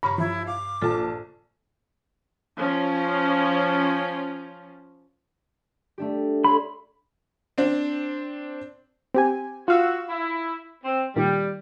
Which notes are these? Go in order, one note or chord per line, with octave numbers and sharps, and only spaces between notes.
G2 C#3 A#5 B5 C#6
F3 E4
F5 D6
A#1 F4 A4 A5
F3 C#4
A3 D4 G4
A4 C#5 B5 C6
C4 D4
C4 G4 G#5
F4 F#4 F5 E6
E4
C4
A#2 D#3 G3